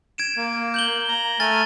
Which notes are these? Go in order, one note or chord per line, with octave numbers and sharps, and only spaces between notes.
G#6 D7 E7
A#3
G6 F#7 G7
A#5
A3 G#5 F6 A6